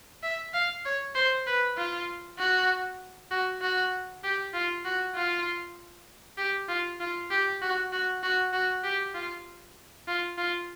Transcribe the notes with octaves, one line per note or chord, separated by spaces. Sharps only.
E5
F5
C#5
C5
B4
F4
F#4
F#4
F#4
G4
F4
F#4
F4
G4
F4
F4
G4
F#4
F#4
F#4
F#4
G4
F4
F4
F4